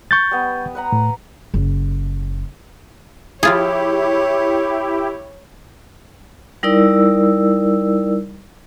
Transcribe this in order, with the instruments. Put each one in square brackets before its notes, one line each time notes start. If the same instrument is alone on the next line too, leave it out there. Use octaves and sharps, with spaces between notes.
[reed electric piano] C#6 G6 A6
[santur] G3 B3
B4 F#5 A#5
[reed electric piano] A2
[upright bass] F#1
[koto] F3 F4 G#4 [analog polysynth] E4 G4 [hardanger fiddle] C#5
[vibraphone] G3 D#4 E4 A#4 D5 E6